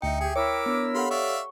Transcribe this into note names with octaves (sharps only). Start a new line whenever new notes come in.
D2 D#4 E5 G5 C#7
G4 G#4 G5
E4 A#4 C#5 D6 E6 C#7
B3 D4
G4 A4 F5 F#5 B5 C6
D5 E5 F5 C#6